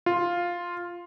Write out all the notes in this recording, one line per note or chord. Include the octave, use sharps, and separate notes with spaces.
F4